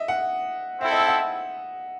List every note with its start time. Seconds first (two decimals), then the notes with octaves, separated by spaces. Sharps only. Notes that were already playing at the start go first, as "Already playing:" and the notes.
Already playing: D#5 E5
0.08 F#5
0.80 C4 E4 A4 E5
0.91 D#5
0.99 E5
1.08 F#5